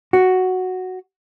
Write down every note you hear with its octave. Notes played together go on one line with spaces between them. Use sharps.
F#4